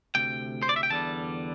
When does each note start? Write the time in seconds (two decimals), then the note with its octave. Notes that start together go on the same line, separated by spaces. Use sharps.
0.15 D2 C3 G5
0.62 C5
0.69 D5
0.76 E5
0.83 G5
0.90 E2 D3 G3 A5